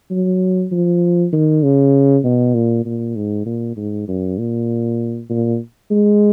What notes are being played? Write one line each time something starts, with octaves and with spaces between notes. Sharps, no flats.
F#3
F3
D#3
C#3
B2
A#2
A#2
G#2
A#2
G#2
F#2
A#2
A#2
G#3